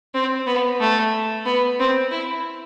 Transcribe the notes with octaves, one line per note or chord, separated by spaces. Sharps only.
C4
B3
A3
B3
C4
E4